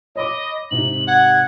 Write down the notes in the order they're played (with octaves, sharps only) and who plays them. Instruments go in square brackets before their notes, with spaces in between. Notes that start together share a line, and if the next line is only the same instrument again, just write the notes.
[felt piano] C#5 B5 D6 [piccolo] D#5
[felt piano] G#2 C3 D#4 [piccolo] F#7
[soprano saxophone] F#5 [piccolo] G#6